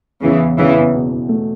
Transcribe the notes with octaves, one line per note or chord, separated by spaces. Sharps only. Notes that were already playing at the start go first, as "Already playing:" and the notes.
E2 C#3 E3
E2
E2 C#3 E3
E2
B2
E2
A3